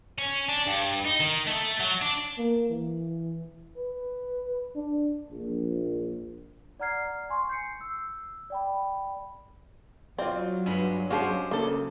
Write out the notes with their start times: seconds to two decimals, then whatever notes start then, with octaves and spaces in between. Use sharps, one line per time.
0.18 C#4
0.49 D4
0.67 G2
1.05 D#4
1.20 D#3
1.47 A3
1.80 F#3
2.01 D4
2.38 A#3
2.70 E3
3.77 B4
4.75 D4
5.31 A#1
6.80 D5 F#5 A#5 F6 G#6 C7
7.30 G#5 C6 C#6
7.49 G6 C7 C#7
7.81 E6
8.50 D5 G5 B5
10.18 F#3 C4 F4 D5
10.66 G2 G#3 B5
11.10 G#3 C#4 G4 G#4 C5 F5 F#5 A5
11.51 C#3 A#3 A4